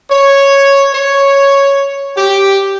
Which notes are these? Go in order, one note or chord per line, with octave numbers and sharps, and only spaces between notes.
C#5
C#5
G4